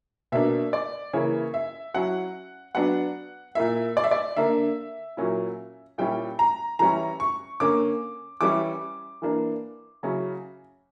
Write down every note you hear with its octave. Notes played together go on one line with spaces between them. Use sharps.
B2 A#3 D4 E5
D5
C#3 E3 A#3 E4 C#5
E5
F#3 C#4 E4 F#5
F#3 B3 D4 F#5
A#2 A#3 E4 E5
D5
E5
D5
D3 A#3 D4 E5
A#2 F#3 A#3 C#4 E4
A#2 G3 C#4 E4 G5
A#5
E3 G3 C#4 E4 A#5
C#6
D3 A#3 C#4 D6
E3 G3 C#4 E4 D6
E3 A#3 D4
C#3 F#3 C#4 E4